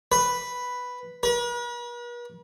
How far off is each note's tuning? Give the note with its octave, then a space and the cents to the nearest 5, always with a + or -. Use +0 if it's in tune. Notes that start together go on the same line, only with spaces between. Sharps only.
B4 +0
B4 -45